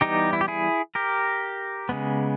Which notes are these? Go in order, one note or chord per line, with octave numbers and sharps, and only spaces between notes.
E3 G3 B3 D#4 G4
E4
G4
E4 G#4
G4 A#4
C#3 G#3 B3